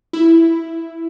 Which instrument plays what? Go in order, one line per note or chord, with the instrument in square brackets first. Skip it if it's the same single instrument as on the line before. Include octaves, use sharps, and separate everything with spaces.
[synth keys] E4